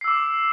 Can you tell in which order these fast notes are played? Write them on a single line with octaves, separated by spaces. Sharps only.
C7 E6 D6